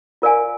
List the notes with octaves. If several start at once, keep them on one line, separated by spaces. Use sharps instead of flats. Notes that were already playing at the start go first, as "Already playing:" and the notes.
F4 A#4 D5 F5 G#5